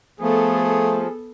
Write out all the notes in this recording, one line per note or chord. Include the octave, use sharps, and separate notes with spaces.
F3 A3 B3 G#4 A4